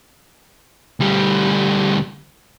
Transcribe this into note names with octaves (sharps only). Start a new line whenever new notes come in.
D2 G3